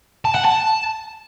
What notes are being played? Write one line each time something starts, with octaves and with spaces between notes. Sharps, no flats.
A5
F#5
A5